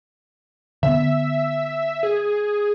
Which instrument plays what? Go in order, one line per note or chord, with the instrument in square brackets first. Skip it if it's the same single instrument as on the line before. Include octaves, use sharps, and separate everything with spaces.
[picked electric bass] D3 B3 [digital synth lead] E5
[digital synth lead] G#4